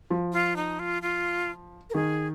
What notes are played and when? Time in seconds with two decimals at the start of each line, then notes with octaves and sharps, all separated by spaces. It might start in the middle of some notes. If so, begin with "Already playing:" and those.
0.10 F3
0.33 F4
0.56 D#4
0.79 F4
1.02 F4
1.90 A#4
1.94 D#3 G#4